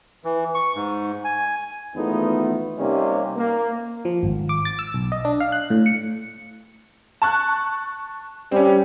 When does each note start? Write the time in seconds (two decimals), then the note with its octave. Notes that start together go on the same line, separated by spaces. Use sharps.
0.25 E3
0.55 C#6
0.75 G#2
1.25 G#5
1.96 G#1 E2 A3 B3 D#4 F4
2.78 C3 G3 A#3 C#4 D#4
3.37 A#3
4.05 F3
4.23 G#1
4.49 D6
4.65 A6
4.79 E6
4.94 B1
5.12 D#5
5.25 D4
5.40 F5
5.52 F#6
5.70 A2
5.86 C#7
7.22 A5 C#6 F#6
8.52 G3 C4 C#4